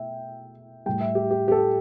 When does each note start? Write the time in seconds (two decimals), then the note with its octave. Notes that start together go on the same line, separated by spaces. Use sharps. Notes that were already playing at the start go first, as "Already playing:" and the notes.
Already playing: B2 A3 E5 G5
0.86 A2 G3 G5
1.01 E5
1.15 G4
1.31 G4
1.48 G4
1.52 A4